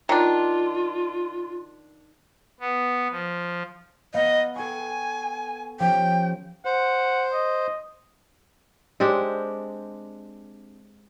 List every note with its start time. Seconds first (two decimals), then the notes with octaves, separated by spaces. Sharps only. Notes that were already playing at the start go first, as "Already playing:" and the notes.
0.09 D#3 D4 F4
2.60 B3
3.11 F3
4.14 B3 D#5 F5
4.56 A4 G5 G#5 C#6
5.80 F3 C#4 G4 G5
6.65 C5 F#5
7.33 D#5
9.00 G#3 C4 D4 G4